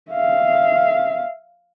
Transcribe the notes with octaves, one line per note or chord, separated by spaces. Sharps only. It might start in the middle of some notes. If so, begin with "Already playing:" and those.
E5 F5